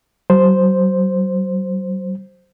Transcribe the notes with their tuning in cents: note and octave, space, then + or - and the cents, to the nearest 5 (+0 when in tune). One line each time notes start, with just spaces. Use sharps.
F#3 +40 C5 +0